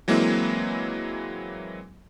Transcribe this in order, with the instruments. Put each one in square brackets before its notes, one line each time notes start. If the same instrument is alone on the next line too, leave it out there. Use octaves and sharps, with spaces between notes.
[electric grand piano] E3 F#3 G#3 A#3 C4 E4